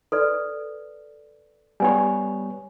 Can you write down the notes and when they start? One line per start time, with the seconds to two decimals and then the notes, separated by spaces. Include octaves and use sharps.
0.12 A4 B4 D5
1.80 G3 B3 G4 C#5 G#5